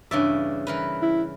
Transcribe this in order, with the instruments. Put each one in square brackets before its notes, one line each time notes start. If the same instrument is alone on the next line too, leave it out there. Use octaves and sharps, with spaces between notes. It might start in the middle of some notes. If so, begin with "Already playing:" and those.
[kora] G2 E5 [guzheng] C#3 E3 D5
[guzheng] E3 A#4 B4
[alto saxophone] E4